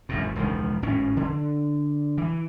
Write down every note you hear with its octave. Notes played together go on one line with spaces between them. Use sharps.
G#1 F#2 A2
E1 C#2 D#3 F3
G#1 A2 C#4
D3
E3